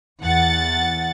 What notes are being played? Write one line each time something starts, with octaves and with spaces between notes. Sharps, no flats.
E2 F#5 A6